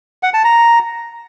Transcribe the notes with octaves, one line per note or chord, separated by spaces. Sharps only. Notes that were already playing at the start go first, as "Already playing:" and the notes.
F#5
A5
A#5